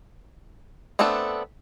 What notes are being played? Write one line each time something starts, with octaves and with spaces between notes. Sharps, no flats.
A3 B3 C4 D4 A4